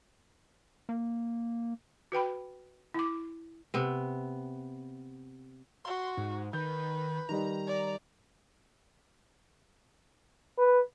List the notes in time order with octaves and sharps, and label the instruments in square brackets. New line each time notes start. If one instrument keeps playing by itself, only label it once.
[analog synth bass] A#3
[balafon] F#4 B4 G5 B5
E4 D6
[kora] C3 B3
[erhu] F#4 [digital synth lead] C6
[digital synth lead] G#2
[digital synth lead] D#3 [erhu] B4 [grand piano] G6
[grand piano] D#3 G3 D#4 [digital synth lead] A#5
[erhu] D5
[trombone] B4